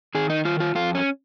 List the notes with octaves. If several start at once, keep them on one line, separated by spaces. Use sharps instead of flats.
D#3 G#4
D#4
D#3 F4
F4
F2 F4
C#4